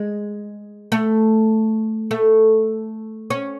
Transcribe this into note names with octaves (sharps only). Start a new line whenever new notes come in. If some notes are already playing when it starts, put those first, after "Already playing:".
Already playing: G#3
A3
A3
C#4